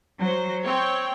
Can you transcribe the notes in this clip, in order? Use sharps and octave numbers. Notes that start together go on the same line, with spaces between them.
F#3 C5
C4 C#5 G5